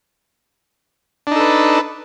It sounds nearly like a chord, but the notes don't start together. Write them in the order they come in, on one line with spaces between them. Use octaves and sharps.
D4 D#4 A4 B4